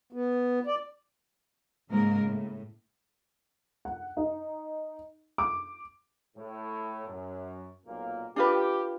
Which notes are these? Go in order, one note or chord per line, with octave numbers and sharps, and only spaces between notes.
B3
D5
G#2 C#3 G#3 A#3 A#4
A2
F#5
D#4
D6
A2
F#2
B1 A#2 A#3
D4 F4 G4 B4